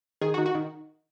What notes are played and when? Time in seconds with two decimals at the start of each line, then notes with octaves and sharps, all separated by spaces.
0.21 D#3 G#4
0.34 F#4
0.38 D#3
0.46 F#4
0.55 D#3